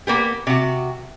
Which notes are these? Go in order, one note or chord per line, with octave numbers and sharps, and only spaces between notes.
A#3 B3 G4
C3 F#4